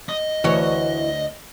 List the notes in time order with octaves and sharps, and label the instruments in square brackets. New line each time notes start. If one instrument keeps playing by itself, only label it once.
[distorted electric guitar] D#5
[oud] D2 F#4 C#5 [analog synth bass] E3